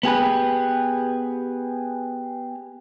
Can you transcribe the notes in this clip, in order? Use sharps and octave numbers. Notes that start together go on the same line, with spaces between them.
B3 G4 G#4 B4